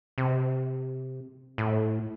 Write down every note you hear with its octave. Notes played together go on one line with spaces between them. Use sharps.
C3
A2